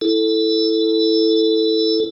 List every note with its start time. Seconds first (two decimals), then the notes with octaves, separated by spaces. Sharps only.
0.01 E4 A4